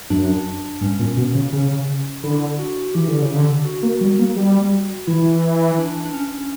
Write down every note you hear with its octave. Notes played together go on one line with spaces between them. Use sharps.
F#2 D4
G2 C#4
A#2
B2
C#3
C#3 C#4
D3 E4
F#4
E3 G4
D3
C#3
D3
F#4
A#3
G3
A#3
G3
E3 E4
D4
D4
C#4